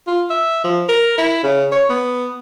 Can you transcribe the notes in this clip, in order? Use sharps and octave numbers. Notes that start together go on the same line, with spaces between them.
F4
E5
F3
A#4
E4
C#3
C#5
B3